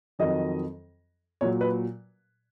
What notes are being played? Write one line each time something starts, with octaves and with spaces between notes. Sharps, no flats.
F2 D#3 F#3 D#5
A#2 F#3 C#5
B4